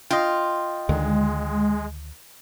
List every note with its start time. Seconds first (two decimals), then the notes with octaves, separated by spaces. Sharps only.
0.11 F4 D#5 G5
0.89 D2 D3 D#3 G#3